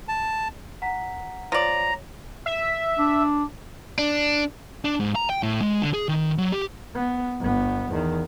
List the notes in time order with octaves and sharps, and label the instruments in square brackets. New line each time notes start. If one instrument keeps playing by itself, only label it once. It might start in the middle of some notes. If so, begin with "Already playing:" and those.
[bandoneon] A5
[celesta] F#5 A#5 B6
[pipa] F3 D5 [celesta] C#5 [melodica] A#5
[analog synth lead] E5
[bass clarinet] D4
[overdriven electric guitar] D4
[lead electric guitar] D4
G#2
A#5
G5
A2
G#3
D3
G#4
D#3
F#3
G4
[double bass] B3
G1 B3
E2 D#3